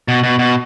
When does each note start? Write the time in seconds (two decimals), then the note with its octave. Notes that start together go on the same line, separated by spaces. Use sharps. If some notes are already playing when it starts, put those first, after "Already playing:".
0.08 B2
0.23 B2
0.39 B2